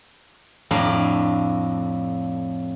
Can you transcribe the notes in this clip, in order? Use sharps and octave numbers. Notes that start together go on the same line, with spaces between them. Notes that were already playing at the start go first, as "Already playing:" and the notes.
F2 A2 D4 F5 A#5